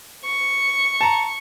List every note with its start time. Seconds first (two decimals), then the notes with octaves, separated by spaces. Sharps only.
0.25 C#6
1.01 A5 A#5